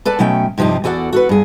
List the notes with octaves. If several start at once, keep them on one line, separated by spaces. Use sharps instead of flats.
A4 B4 D5 A5
B2 F#3 A3 C#4 G5
G2 C3 F3 D#4 G4
E2 F#4 A4 D5 F#5
F#4 A4 B4
G2 G#4